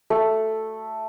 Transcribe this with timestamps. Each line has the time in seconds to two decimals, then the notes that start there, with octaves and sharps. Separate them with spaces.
0.10 A3